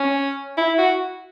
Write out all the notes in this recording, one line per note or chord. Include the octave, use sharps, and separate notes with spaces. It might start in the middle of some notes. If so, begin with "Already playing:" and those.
Already playing: C#4
E4
F#4